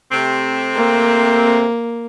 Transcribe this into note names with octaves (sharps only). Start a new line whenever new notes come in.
C3 A3 C4
A#3